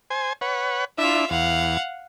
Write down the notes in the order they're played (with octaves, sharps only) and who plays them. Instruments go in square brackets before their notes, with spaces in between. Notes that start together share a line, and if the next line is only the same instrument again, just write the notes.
[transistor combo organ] C5 G#5
B4 C#5 F#5
[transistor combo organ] D4 E4 [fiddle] F4 E5
[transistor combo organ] E2 [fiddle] F5 F#5